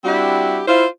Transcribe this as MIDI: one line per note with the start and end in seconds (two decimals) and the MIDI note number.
0.05 0.61 55
0.05 0.61 60
0.05 0.61 62
0.05 0.61 64
0.05 0.61 66
0.05 0.61 67
0.67 0.85 64
0.67 0.85 65
0.67 0.85 72